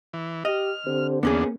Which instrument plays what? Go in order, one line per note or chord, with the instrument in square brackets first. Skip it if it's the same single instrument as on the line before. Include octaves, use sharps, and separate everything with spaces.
[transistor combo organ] E3
[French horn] G4 [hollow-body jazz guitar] D#5 [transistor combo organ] F6
[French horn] D3 [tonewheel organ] C4 G4 C5
[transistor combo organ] E2 D4 [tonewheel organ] A#3 [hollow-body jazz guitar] B3 C#4 G#4